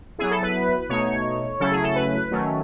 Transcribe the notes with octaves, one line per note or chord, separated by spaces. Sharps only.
F#3 B3 E4 G#4
A4
B4
B2 A3 D#4 C#5
C#3 F#3 A3 C#4 E4 A4
G#4
A4
B4
D#3 F#3 A3 C#4